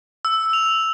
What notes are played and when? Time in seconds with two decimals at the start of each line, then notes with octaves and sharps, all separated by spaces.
0.25 E6
0.53 F7